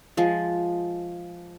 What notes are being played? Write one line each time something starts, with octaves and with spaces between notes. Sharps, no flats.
F3 G#3